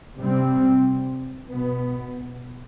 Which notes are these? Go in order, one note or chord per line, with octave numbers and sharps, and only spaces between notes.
C3 G3 C4
B2 B3